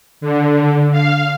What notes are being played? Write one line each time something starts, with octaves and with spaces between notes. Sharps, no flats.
D3
F5